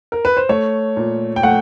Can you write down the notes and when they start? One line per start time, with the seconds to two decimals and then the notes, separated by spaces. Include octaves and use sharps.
0.12 A#4
0.25 B4
0.37 C5
0.49 A3 C#5
0.97 A#2
1.36 G5
1.43 A3 F#5